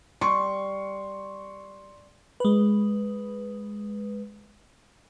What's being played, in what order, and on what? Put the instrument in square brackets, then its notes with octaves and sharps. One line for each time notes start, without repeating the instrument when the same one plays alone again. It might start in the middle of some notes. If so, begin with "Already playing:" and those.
[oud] G3 [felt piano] C6 C#6
[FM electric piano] G#3 B4